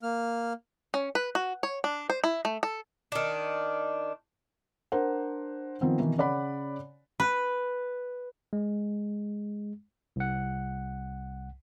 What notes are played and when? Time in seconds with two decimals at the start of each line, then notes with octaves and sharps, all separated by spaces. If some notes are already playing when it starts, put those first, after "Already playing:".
0.03 A#3 F6
0.94 C#4
1.15 B4
1.35 F#4
1.63 C#5
1.84 D4
2.10 C5
2.24 E4
2.45 A3
2.63 A4
3.12 D#3 D4
4.92 D4 A#4 C5 F#5
5.81 D#3 F3 B3 C4
5.99 B2 D#3 E3
6.18 C#3 C#5 D5 F#5 B5
7.20 B4
8.53 G#3
10.16 C2 F#5